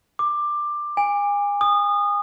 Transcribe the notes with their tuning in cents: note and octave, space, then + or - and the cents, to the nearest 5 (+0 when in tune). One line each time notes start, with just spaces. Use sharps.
D6 +15
G#5 -30
D#6 -25